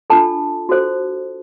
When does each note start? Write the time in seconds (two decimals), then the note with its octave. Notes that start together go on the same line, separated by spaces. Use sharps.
0.10 D4 F4 A4 A5
0.69 F#4 A4 C5